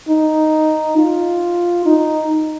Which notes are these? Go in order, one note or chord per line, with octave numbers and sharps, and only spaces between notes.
D#4
F4
D#4